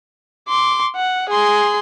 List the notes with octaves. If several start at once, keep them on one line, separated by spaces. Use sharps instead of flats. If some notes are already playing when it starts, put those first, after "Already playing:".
C6 D6
F#5
G#4 C6